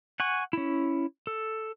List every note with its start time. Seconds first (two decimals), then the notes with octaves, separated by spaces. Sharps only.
0.20 F#5 G#5 C#6
0.53 C#4 E4
1.27 A4